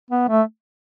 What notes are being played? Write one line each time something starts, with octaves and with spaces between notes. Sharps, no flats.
B3
A3